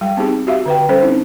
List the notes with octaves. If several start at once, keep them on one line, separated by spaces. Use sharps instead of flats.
G3 G5
B3 C4 D#4 G4 G#4
F#4 G4 E5 F5
D3 B4 G5
G3 C#4 A4 C5
C4 D#4 E4